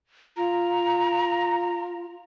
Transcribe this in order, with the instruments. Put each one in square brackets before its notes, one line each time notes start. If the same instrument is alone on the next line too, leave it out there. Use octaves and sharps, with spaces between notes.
[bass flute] F4 [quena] A#5